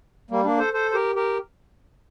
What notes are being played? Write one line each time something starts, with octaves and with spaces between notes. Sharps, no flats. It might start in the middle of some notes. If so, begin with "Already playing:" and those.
G3 A#3
A#3 D4
A4 C5
A4 C5
C5
G4 A#4
G4 A#4